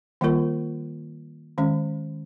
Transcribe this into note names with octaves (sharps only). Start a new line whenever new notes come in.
D#3 G3 A#3 F4 A#4
D#3 G#3 C#4